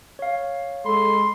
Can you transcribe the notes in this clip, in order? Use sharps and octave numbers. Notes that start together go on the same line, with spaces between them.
C#5 F5
G#3 A4 B5 C6